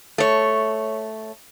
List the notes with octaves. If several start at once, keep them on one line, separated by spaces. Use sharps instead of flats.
A3 C#5